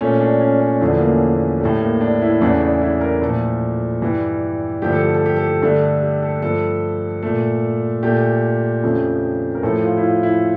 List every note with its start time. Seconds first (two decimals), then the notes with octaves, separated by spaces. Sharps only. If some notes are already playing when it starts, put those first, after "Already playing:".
0.01 A#2 A3 C#4
0.21 D4
0.41 C#4
0.60 C#4
0.81 E2 D3 F3 A3 D4
0.98 A#3
1.07 C#4
1.34 A#3
1.61 A2 G3 A3
1.81 A#3
2.01 D4
2.22 E4
2.41 E2 C#3 E3 A3 D4
2.61 D4
2.81 E4
3.01 A#4
3.22 A#2 F3 A3 A4
4.02 G2 E3 G3
4.82 G2 D3 F3 A3 G4
4.92 A4
5.04 G4
5.14 A4
5.26 G4
5.36 A4
5.47 G4
5.62 G2 D3 A3 D4
5.82 A4
6.02 G4
6.22 A4
6.42 G2 F3 A3 A4
7.22 A#2 A3
8.03 A#2 A3 G4
8.83 F2 C#3 F3 A3
9.55 A#4
9.63 A2 F3 A3 A4
9.84 F4
9.97 E4
10.03 F4
10.23 E4